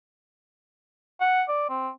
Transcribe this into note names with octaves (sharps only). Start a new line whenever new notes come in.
F#5
D5
C4